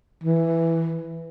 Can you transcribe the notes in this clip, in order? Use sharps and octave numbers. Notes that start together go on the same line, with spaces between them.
E3